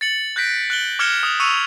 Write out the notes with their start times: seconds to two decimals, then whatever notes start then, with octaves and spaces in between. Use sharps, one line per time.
0.01 A6 C#7 F#7
0.36 F#6 G6 A#6 B6 D7
0.70 F#6 F#7 G7
0.99 D6 F6 G#6 C#7 E7 G7
1.23 D#6
1.40 C#6 E6 C#7 D#7 F7